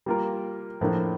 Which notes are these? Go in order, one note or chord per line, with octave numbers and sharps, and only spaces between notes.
G3 A#3 F4 A#4
A2 F3 A#3 D4 A4